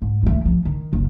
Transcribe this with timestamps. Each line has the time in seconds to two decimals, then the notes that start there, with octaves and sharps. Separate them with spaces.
0.02 G#2
0.23 E3 A3
0.45 F3
0.65 D#3
0.93 F#1